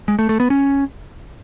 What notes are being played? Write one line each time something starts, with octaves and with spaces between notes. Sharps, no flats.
G#3
A3
A3
B3
C#4